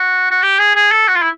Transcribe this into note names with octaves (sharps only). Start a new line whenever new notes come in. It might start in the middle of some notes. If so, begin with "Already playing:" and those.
Already playing: F#4
F#4
G4
G#4
G#4
A4
F#4
F4
E4